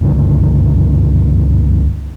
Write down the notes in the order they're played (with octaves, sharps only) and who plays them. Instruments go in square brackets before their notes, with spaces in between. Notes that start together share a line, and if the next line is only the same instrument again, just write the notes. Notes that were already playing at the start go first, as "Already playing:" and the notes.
[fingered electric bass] F#1 C#2 G2 D3